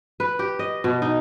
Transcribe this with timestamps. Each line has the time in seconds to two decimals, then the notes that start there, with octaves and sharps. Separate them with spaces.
0.20 B4
0.39 G4
0.59 D#5
0.84 B2
1.02 D#4